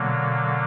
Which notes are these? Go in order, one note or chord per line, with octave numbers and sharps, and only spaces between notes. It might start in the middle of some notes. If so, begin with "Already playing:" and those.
Already playing: B2 D3 F#3 A#3